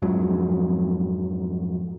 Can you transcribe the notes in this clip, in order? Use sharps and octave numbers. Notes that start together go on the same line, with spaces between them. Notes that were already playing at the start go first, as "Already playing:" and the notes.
F2 G#2 F3 F#3